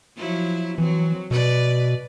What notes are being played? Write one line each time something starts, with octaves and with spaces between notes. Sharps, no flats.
F3 F#3 E4
E3 F#3 C4
B2 B4 D5